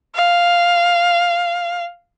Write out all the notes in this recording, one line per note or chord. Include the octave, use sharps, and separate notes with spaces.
F5